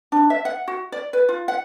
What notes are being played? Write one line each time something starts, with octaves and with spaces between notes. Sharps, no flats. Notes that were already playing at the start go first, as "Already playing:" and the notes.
D4
E5
F#5
F#4
D5
B4
F4
F#5